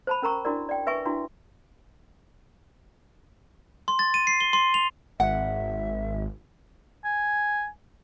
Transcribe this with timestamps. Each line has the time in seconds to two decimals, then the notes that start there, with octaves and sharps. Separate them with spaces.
0.07 C5 A5 B5
0.22 C#4 A#4 A#5 C#6
0.45 D4 E4 F#4 A#4 D5
0.69 D5 G5
0.87 B4 E5 G#5 C#6
1.05 D4 E4 F#4
3.88 C6
3.99 A6
4.14 D#7
4.27 C7
4.41 G7
4.53 C6
4.74 F7
5.20 G#1 E5 F#5
7.05 G#5